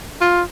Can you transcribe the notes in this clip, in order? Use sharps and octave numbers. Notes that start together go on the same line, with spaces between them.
F4